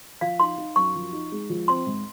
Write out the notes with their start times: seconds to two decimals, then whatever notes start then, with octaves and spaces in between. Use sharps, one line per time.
0.21 F3 F5
0.40 D#4 C6
0.58 D#4
0.76 F#2 C#6
0.95 F3
1.13 D#4
1.32 G#3
1.50 F3
1.68 C4 C6
1.87 G#2